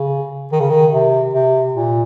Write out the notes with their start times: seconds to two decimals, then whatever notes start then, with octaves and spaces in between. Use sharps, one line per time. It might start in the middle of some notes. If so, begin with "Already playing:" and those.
Already playing: C#3
0.52 D#3
0.60 C#3
0.70 D#3
0.92 C3
1.33 C3
1.74 A#2